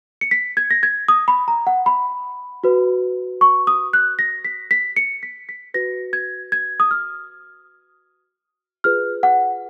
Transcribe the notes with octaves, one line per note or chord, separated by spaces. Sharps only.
C#7
B6
G#6
A#6
G#6
D#6
B5
A#5
F#5
B5
F#4 B4
C#6
D#6
F#6
A#6
B6
B6
C#7
B6
B6
F#4 B4 A#6
G#6
G#6
D#6
F6
F4 G#4 B4 F6
F#5